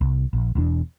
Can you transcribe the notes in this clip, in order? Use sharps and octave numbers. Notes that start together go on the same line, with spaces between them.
C2
A#1
E1 E2 D4